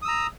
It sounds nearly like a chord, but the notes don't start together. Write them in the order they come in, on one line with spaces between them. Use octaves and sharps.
D#6 E6 A#5